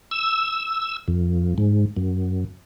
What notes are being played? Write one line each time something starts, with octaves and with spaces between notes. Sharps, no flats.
E6
F2
G#2
F#2